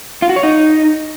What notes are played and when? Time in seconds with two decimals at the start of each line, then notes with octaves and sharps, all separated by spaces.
0.22 F4
0.29 F#4
0.36 C#5
0.43 D#4